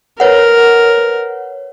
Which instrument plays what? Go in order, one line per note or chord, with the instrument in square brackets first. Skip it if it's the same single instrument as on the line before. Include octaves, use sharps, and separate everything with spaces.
[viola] A#4 [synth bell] B4 C#5 F#5